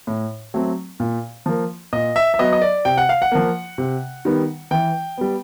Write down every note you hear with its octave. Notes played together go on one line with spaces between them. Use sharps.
A2
F#3 A3 C4
A#2
F3 A#3
A#2 D#5
E5
E5
F#3 B3 D#5
D#5
D5
C3 G5
F#5
F5
F#5
F3 A#3
C3
D#3 G3 B3
E3 G5
G3 B3